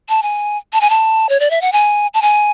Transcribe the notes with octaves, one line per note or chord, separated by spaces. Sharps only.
A5
G#5
A5
G#5
A5
C#5
D5
E5
F#5
G#5
A5
G#5